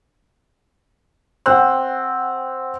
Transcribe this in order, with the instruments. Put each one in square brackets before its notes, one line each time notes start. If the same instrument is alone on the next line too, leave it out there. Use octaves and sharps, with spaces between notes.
[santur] C4 [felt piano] F#5 G5 F#6